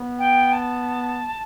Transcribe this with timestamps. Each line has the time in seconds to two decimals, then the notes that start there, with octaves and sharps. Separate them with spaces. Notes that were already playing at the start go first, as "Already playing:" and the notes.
Already playing: B3
0.19 G5
0.53 A5